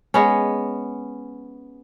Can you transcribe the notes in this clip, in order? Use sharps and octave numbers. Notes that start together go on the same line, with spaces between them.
G#3 B3 C#4